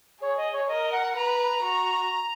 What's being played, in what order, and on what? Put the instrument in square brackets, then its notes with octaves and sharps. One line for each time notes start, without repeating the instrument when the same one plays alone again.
[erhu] G#4 [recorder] C#5
[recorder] D#5
C#5
[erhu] A#4 [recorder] D#5
[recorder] F#5
[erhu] B4 [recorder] A#5
[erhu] F#4